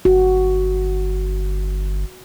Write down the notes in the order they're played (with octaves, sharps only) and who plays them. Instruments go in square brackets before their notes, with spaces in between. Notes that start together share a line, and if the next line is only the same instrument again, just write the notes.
[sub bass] G1 [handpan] F#4